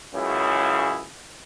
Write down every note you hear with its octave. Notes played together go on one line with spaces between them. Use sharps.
C#2 F#2 C#3 E4 G#4